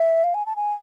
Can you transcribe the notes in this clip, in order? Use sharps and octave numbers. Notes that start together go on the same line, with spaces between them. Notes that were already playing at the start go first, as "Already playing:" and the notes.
Already playing: E5
F5
G#5
A5
G#5